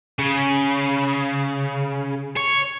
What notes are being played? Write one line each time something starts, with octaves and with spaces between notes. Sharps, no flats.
C#3
C#5